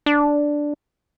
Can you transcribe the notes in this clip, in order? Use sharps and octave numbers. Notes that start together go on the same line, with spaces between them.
D4